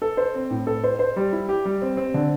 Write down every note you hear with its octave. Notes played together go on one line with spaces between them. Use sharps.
A4
C5
C4
A2
A4
C5
C5
G3
E4
G4
G3
C4
C4
D3